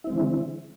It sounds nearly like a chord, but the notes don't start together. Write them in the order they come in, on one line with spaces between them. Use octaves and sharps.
E4 C4 G#3 E3 D3